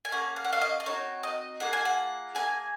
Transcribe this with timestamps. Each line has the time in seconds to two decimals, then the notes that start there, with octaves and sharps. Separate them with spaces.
0.05 G#5
0.12 A#3 C#4 G#4 F#5
0.36 F5
0.44 F#5
0.53 F5
0.61 D#5
0.80 D#5
0.86 C4 D#4 F#4 C#5
1.23 D#5
1.60 A#3 F4 G#4 F#5
1.73 G#5
1.85 F#5
2.35 A#3 C#4 G#4 G#5